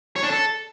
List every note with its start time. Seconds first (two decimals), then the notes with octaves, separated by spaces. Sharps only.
0.16 C#5
0.23 D4
0.30 A4